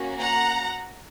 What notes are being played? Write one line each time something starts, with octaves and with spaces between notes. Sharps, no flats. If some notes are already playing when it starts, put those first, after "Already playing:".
Already playing: A#3 C#4 F#4
F#5 A#5